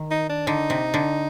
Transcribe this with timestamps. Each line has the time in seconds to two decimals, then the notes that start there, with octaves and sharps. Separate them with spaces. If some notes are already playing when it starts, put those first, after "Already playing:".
Already playing: D#3
0.11 D#4
0.29 D4
0.47 D3 D#4
0.70 C3
0.94 D3